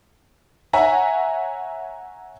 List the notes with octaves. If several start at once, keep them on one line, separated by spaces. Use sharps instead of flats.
C#5 E5 F#5 G#5 A#5